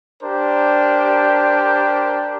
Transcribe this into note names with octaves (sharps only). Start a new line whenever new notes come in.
D4 G4 A#4 C5